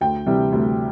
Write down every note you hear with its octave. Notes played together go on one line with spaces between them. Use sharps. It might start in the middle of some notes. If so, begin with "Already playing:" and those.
D2 G5
C3 E3 G3
D2